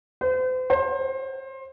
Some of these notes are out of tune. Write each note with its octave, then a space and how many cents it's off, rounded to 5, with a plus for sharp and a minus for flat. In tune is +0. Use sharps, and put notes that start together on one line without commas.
C5 -40
C5 +25